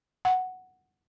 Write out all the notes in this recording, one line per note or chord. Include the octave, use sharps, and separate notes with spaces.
F#5